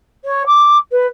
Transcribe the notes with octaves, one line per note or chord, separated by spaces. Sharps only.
C#5
D6
B4